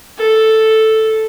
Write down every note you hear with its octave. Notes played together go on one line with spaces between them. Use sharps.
A4